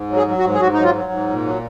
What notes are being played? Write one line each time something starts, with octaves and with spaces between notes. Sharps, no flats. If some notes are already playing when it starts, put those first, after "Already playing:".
Already playing: G#2
F#3
G#4
F#3
F#4
G#2
G#4
G#2 F#4
D#4
F#3
F4
F#3
G#2
A#2
F#3